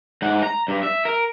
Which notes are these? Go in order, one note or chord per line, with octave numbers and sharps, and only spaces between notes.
G#2 F#5
A#5
G2
E5
A#4